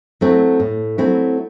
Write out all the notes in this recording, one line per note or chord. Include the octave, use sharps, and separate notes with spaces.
F#3 A3 C4 E4
A2
F#3 A3 C4 E4